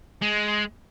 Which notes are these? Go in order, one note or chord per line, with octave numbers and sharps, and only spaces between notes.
G#3